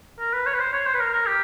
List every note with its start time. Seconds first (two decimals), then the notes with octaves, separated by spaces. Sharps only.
0.19 A#4
0.33 B4
0.46 C#5
0.54 B4
0.60 C5
0.73 C#5
0.86 C5
0.94 B4
1.00 A#4
1.13 A#4
1.27 G4